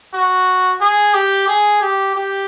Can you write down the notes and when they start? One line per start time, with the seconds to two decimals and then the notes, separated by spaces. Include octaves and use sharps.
0.14 F#4
0.81 G#4
1.14 G4
1.48 G#4
1.81 G4
2.15 G4